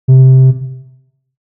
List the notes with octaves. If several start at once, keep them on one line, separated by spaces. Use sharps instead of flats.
C3